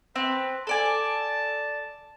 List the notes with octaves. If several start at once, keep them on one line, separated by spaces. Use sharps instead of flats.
C4 B4
A4 D5 G#5 A5